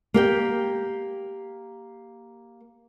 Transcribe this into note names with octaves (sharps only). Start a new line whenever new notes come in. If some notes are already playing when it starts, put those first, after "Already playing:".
A#3 G4 G5